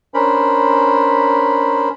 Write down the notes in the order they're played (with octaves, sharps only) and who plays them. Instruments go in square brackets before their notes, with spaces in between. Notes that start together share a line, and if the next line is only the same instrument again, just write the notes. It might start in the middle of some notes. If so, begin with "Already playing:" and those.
[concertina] C#4 D4 A#4 C5 B5